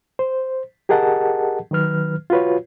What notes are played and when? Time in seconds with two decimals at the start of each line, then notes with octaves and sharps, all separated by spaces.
0.19 C5
0.89 G4 G#4 A#4 D#5 F#5 A5
1.71 D#3 F#3 B4 F6
2.30 F4 F#4 B4 C#5